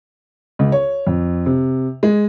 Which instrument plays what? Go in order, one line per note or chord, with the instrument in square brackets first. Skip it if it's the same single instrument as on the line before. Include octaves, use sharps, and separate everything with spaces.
[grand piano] C#2
C#5
F2
C3
G#3